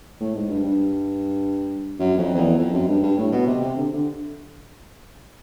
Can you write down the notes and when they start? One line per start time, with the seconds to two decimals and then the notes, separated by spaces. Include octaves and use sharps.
0.20 A2
0.35 G#2
0.49 G2
0.64 G2
1.99 F#2
2.18 F2
2.34 F2
2.38 E2
2.57 F2
2.73 F#2
2.88 G2
3.03 G2
3.18 A2
3.32 B2
3.47 C3
3.61 C3
3.76 D3
3.92 D3